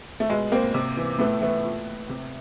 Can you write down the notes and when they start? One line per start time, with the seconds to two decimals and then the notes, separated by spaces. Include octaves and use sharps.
0.20 A3
0.30 B2 G#3
0.52 A#3 C4
0.74 C3
0.97 E3
1.19 A2 A3 B3
1.41 E3 A3 B3
1.64 A#2
2.09 C3